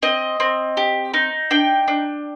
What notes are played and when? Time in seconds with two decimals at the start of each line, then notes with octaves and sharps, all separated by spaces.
0.03 C4 D#5
0.40 C4
0.77 G4
1.14 D#4
1.51 D4 G5
1.88 D4